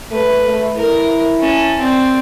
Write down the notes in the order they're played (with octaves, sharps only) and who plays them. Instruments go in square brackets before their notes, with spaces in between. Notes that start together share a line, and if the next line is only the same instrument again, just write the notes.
[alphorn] A3 [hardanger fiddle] B4
[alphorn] A3
[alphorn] E4 [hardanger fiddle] A#4
[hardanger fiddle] C#4 A5
C4 D5